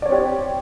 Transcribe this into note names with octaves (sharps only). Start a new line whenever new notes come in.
C4 G4 C#5 D5